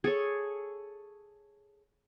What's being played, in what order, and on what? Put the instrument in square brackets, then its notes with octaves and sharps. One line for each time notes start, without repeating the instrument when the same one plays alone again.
[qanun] G#4 A4 C#5